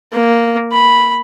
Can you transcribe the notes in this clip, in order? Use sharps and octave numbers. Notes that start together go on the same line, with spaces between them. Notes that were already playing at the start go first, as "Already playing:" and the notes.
A#3
B5